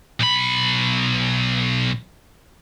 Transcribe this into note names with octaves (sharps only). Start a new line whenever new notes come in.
B1 B5